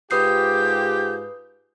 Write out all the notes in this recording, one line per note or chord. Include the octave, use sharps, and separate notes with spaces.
G#2 F4 G4 B4 D#6 G6 C7